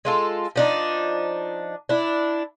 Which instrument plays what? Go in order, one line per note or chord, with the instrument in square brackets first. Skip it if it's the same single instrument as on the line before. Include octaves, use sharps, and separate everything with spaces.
[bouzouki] G#3 F4 A4
F3 D4 D#4
D4 E4